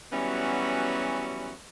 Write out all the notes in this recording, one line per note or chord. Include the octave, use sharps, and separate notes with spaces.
E3 F#3 G3 B3 C#4 F#4